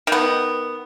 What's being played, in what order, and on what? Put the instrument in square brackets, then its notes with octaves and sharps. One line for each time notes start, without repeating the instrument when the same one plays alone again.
[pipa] D#3 B3